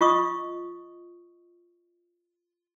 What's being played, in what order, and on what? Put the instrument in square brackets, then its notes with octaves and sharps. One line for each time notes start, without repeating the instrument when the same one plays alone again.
[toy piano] F4 D#5 C#6 D#6